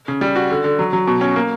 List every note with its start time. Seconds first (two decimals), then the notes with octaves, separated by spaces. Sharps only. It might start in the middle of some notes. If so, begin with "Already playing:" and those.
0.08 C#3
0.21 G3
0.36 F#4
0.51 D3
0.64 D3
0.79 F#3
0.93 F#3
1.08 B2
1.21 C#4
1.36 A#3